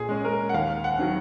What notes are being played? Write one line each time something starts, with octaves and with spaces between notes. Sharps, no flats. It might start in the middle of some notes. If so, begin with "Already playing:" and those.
Already playing: A#2 G#4
G#3 C#4
A#4
F#5
D#2 F5
F#5
D#3 F#3